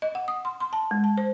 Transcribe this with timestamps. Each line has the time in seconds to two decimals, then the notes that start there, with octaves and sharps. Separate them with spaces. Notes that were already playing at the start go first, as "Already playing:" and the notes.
0.02 D#5
0.15 F#5
0.28 D#6
0.45 C6
0.60 C6
0.73 A5
0.91 G#3
1.04 A5
1.18 C5